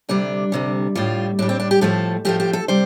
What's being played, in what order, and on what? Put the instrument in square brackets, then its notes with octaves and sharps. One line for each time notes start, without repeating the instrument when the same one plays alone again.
[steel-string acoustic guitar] D2 C3 G3 D4
D2 C3 G3
A2 G3 F4
A2 D4
G3
C4
D4
G4
A2 F3 A3 A4
A2 F3 A3 G4
G4
A4
C3 G3 C5